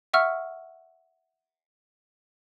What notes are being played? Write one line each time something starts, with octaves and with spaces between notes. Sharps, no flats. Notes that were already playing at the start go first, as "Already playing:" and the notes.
E5 F#5 C#6 E6 F6